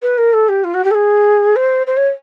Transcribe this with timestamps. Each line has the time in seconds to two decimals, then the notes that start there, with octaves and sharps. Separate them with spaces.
0.02 B4
0.17 A#4
0.33 A4
0.48 G4
0.64 F4
0.74 F#4
0.84 G4
0.90 A4
0.94 G#4
1.55 C5
1.86 C5
1.96 C#5